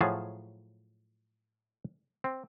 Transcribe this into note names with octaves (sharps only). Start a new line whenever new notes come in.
A2 F3 F#3 G#4 A5
C4